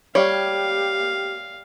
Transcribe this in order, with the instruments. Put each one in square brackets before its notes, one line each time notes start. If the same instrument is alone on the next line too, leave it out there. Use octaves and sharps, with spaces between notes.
[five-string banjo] G3 C#5 [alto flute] G4 [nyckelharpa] F5